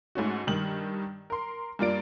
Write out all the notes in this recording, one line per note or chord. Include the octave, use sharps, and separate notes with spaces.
G#2 A3 C#4 F#4
G2 D#3 F#7
A#4 C6
G2 A#3 F4 D5 D7